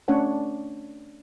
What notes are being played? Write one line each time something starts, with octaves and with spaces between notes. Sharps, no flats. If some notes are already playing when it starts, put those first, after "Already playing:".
A3 C#4 D4 C#5 F#5 A5